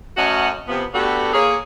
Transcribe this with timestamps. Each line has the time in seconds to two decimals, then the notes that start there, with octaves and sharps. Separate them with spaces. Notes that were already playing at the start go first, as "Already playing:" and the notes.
0.17 F#2 A3 C#4 F#4 D#5 F#5
0.68 C3 F3 B3
0.94 A3 B3 D4 F#4 G4 A4
1.34 A#3 G#4 C#5